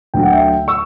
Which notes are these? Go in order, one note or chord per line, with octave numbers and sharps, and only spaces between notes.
D2 D3 F#3 G5
F#5
E5 G5
C#6 E6